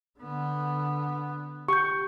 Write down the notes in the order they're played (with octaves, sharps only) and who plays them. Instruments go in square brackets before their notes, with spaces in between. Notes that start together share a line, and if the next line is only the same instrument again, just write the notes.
[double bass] D3 B3
[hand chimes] G4 G6 [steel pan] C#6